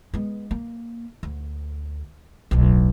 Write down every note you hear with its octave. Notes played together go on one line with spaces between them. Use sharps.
G#3 B3
A#3
D2
D1 B1